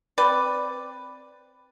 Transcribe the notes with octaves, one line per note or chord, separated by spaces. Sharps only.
C4 B4 D5